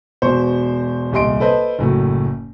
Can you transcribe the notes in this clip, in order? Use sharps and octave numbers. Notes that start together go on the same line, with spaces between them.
E1 B2 C5 C#6
D#1 C2 G4 D#5 C6 D7
A4 B4 C5 D#5
F#1 A2 F#3